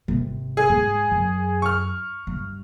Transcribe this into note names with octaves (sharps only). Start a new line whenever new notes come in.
G#1 C3
G#4
G#2
F#2
C#6 F6
G2